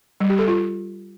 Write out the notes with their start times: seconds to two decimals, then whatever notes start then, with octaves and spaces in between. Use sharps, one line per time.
0.20 G3
0.30 G4
0.39 A4
0.48 F4